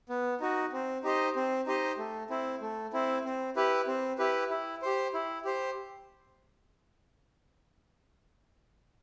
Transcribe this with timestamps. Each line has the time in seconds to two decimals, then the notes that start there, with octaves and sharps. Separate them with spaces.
0.09 B3
0.40 D#4 F#4
0.73 C4
1.03 D#4 G4 C5 D#5
1.36 C4
1.67 D#4 G4 C5 D#5
1.98 A3
2.30 C4 E4
2.61 A3
2.93 C4 E4
3.24 C4
3.56 E4 G4 B4
3.87 C4
4.18 E4 G4 B4
4.50 E4
4.82 G4 C5
5.14 E4
5.45 G4 C5